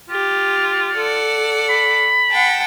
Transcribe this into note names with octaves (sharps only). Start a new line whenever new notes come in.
F4 G4
A4 D5 F#5
B5
F#5 G5 A5